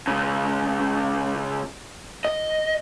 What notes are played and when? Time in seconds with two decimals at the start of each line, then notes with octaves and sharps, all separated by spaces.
0.07 C#2 C#3
2.25 D#5